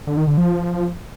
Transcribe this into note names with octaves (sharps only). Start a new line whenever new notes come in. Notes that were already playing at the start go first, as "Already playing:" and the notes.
D3
D#3
D3
F3